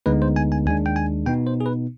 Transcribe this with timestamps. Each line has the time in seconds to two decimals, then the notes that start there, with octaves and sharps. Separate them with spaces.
0.06 D2 D3 G#3 B3 D#4 B4
0.22 C5
0.36 G#5
0.52 G#5
0.66 D#2 D#3 G#3 D4 G#5
0.86 G5
0.96 G#5
1.26 B2 B3 D#4 G5
1.47 C5
1.61 G#4
1.66 B4